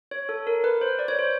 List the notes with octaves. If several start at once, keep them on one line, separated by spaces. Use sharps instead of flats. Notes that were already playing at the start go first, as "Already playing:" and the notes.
C#5
A4
A#4
B4
C5
D5
C#5
C5